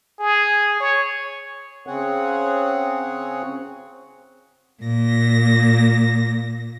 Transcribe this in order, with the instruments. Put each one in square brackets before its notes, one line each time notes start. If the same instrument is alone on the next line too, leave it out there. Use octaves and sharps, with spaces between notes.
[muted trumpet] G#4
C#5
[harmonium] C#3 C4 G#4 C#5 F#5
[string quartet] A#2 A#6